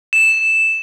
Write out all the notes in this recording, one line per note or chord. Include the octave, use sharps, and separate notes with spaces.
E7